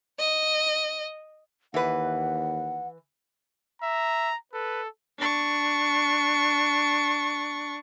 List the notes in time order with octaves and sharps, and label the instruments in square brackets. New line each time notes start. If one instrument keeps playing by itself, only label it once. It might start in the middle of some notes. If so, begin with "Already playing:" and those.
[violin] D#5
[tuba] D#2 [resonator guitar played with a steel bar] E3 B4 [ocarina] F#5
[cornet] E5 [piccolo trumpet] A#5
[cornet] A4 [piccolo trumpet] B4
[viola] D4 C#6